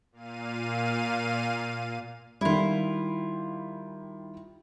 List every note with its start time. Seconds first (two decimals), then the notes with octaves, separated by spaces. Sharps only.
0.12 A#2 F5 D#7
2.41 D#3 G3 E4 F4